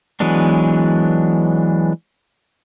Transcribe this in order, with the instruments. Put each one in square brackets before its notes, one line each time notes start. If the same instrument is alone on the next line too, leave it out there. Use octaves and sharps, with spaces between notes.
[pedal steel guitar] E3 F#3 G#3 B3 D4